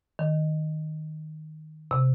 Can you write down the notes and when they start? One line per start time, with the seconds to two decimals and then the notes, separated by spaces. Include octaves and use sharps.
0.19 D#3
1.91 C3